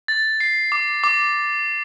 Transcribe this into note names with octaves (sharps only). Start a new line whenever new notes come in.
A6
C7
D6
D6